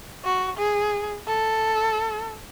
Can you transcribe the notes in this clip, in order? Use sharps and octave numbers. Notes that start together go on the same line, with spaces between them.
F#4
G#4
A4